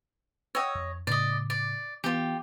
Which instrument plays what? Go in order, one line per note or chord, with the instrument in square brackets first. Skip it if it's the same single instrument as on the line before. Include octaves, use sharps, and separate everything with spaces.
[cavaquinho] C#5 D#5 [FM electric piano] F#5 G5 E6
[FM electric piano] F2
[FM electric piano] A2 C#3 D6 [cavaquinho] D5 D#5
[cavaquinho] D5
[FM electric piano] E3 B3 [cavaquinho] F4 G4